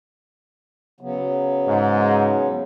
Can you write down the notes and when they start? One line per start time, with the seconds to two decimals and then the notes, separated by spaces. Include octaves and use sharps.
1.01 C#3 F#3 B3
1.67 G#2